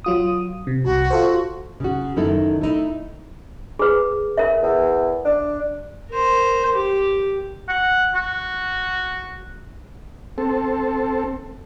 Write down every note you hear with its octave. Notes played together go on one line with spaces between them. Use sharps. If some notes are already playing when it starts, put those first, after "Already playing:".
F#3 F4 D#6
C3
C2 F#4
F4 A4 C5
C#3 F#4
F#2 D#3 D#4 E4 A4
A3 D#4 E4
G#4 B4
A#4 E5
E2
D4
A#4 C5
G4
F#5
F#4
C4 A4